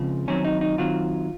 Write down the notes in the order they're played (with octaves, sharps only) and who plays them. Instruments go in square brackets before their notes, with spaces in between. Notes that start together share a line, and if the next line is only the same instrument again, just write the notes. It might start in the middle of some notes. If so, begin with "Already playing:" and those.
Already playing: [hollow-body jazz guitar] C#2 C#3 F3 C4
F#2 D#3 F#3 C4 C#4
D#4
D#4
F#2 D#3 F#3 C4 F4